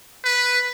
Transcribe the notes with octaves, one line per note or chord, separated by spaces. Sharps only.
B4